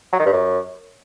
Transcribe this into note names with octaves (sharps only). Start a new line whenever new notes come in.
F#3
D#3
G2
F#2